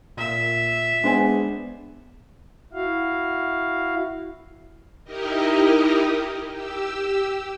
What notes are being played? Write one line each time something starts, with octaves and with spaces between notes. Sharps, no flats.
A#2 E5
G#3 B3 D4 C5 G#5
E4 F#4 F5
D#4 E4 G4 A#4 D#5
G4 E6